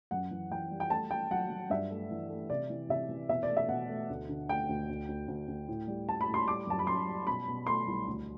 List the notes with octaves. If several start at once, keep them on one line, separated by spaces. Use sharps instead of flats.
F#2 F#5
E3
E3 G5
G3
G5
A3 A5
A3 G5
F#3 F#5
F#3
G2 E5
A3
E3
A3
C3 D5
E3
C3 E5
E3
B2 E5
D5
A3
E5
B2 F#5
A3
D2
D3
A3 G5
D2
D2
D2
D2
D2
A2
G3
G3 A5
B5
A2
C6
G3 D6
F#2 A5
B5
F#2 C6
G3
B2 B5
B2
A3 C6
C2
D2